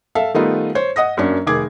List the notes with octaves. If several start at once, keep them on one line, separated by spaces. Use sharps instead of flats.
A4 E5 F5
D#3 G3 A3 B3 D#4 F4
C5 C#5
D#5 F#5 D#6 A#6
F#2 F#3 A#3 C#4 D4
F1 D#3 G#4 D6 G#6